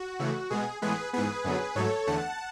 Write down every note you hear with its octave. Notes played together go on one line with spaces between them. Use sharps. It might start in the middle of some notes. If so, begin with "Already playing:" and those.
Already playing: F#4
C#3 E3 A3
B2 G#3 B3 G#4
A2 E3 G#3 B3 G#4 B4
G#2 E3 B3 G#4 B4
F#2 D3 F#3 B3
G#2 F#3 A3 A4 C#5
E2 D3 A3 F#5 A5